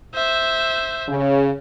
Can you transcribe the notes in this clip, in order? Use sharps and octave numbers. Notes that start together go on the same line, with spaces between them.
C5 E5
C#3